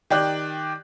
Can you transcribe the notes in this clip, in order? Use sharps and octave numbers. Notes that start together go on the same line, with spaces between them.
D#3 G4 D5 F#6